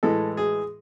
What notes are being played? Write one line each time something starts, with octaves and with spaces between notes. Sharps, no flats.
A2 E3 G#3 A4
G#4